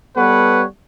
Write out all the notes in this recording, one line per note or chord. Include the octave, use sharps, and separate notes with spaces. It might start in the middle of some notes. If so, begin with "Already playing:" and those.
G3 B3 A4 B4 C#5 F#5